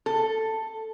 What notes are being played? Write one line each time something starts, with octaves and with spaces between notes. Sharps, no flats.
A4